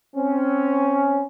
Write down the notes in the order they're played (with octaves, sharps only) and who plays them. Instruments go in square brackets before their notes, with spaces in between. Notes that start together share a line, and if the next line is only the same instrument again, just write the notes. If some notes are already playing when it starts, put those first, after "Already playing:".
[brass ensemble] C4 C#4